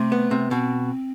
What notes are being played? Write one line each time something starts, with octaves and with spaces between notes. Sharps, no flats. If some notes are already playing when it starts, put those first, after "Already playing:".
Already playing: C3 A3
B3
C3
B2 C4